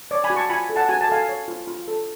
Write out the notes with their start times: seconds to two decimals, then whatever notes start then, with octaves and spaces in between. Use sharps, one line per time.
0.11 C#5 D5
0.24 G#5 B5
0.30 F#4
0.36 A5 C#6
0.49 F4 G#5 B5
0.70 A4
0.76 F#5 A5
0.89 F#4 G#5
1.01 A5
1.09 A4 F5 G#5
1.29 C#5
1.48 F4
1.67 F4
1.88 A4